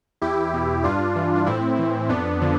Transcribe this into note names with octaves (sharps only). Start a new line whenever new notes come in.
E2 E4 G4
B2
G2 D4 F4
E3
D4
A2 C4 E4
E3
F2 B3 D4
D3 F3